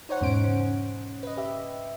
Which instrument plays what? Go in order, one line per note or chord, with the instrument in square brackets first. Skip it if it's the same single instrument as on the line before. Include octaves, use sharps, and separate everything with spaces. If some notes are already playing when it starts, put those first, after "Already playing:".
[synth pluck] D#4 C5 C#5 F#5
E2 G#2 B2 C#4 C5 D7
C#3 C#4
B4 D#5
G4 E5